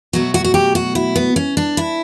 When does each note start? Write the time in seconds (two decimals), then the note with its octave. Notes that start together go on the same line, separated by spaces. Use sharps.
0.13 B2 F#3 A3 F#4
0.34 F#4
0.44 F#4
0.54 G4
0.75 F#4
0.95 E4
1.16 B3
1.36 C#4
1.57 D4
1.77 E4